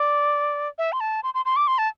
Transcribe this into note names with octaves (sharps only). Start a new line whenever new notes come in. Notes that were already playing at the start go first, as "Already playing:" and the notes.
Already playing: D5
E5
C6
A5
C6
C6
C6
D6
C6
A5